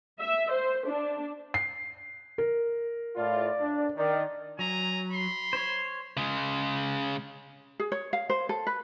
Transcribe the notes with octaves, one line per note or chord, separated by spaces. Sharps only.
E5
C5
D4
C7
A#4
A2 F4 D5
D4
D#3 D5
F#3 G#5 A#5
B5 C6
C5 C#5
C#3 G#3
G#4
C#5
F5
C5
A4
B4